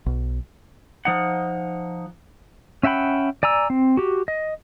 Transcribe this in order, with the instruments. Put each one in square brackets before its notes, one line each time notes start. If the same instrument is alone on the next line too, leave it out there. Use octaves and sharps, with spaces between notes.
[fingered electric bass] B1
[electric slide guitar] F3 D#4 F#5
[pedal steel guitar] C#4 E5 F#5 G5 B5
D5 G#5 A#5 E6
C4
F#4 G4
D#5